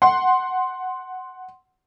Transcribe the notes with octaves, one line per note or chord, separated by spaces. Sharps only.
F#5 C6